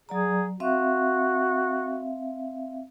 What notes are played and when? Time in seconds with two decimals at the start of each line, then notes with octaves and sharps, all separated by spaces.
0.09 F#3 G#4 D5 A#5
0.60 C4 F#4 E5 F5